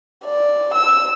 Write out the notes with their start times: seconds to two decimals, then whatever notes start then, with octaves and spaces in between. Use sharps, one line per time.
0.24 D5
0.74 E6